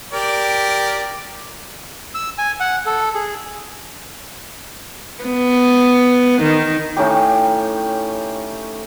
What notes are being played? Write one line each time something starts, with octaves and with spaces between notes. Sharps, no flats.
G4 A#4 D5
E6
G#5
F#5
A4
G#4
B3
D#3
A2 C#4 D#4 G4